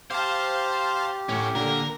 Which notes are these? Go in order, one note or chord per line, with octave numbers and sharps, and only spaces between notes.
G4 C5 F5 A5
A2 C#4 F#4
A#2 D3 A#4